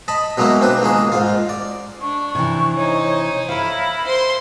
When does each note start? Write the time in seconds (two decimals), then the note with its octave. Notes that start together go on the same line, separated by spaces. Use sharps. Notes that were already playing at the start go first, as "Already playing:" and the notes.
0.08 D#5 A5 B5
0.38 B2 F#3 G#3 A#3 C#4 E4
0.61 C4 D4 B4
0.82 C#2 D#3 A#3 G#4
1.12 G#2 F4
1.49 D5
2.01 D4 C#6
2.35 C3 E3 C#6
2.76 D#4 C5 C#5
3.49 E4 A#4 F5 B5
4.06 C5 C6